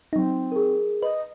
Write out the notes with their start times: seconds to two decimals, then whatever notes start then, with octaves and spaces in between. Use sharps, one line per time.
0.13 F#3 C4 D#4
0.52 G#4 A#4
1.03 B4 D#5